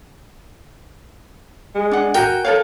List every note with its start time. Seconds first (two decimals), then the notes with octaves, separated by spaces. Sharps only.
1.75 G#3
1.91 D4 F#5
2.15 F#4 A#4 G5 G#5
2.45 A4 A#4 C#5 F5